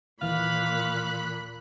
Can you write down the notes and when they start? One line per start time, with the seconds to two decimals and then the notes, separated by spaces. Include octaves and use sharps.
0.22 D#2 A#2 E3 F5 B5 F#6